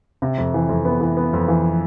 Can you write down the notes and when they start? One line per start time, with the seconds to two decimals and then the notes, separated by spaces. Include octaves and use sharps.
0.22 C3
0.38 F2
0.54 E3
0.69 F2
0.85 B3
1.01 E3
1.17 B3
1.33 F2
1.48 E3